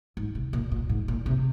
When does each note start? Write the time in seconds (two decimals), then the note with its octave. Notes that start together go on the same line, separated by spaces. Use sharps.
0.17 G#2
0.35 C3
0.53 A#2
0.72 A#2
0.89 G#2
1.08 A#2
1.26 C3